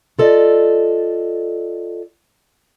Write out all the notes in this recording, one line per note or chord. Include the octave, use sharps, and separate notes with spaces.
F4 A4 D5 D#5